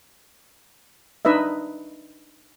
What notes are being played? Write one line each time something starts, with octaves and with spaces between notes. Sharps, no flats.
D4 D#4 B4 D#5 E5